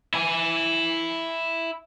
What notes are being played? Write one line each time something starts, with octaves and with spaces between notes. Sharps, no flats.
E4 G#5